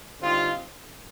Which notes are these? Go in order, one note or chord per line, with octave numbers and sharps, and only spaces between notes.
D3 G3 C4 D#4 F4